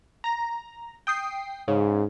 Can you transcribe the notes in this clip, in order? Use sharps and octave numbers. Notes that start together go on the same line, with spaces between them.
A#5 A#6
G5 D#6 C7
G#2 C#3